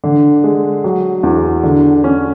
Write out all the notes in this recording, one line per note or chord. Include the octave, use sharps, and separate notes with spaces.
D3
G#3
F#3
E2
D3
C#4